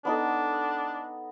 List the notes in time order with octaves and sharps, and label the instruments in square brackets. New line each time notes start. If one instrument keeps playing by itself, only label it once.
[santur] B3 D#4 A4 [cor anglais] D4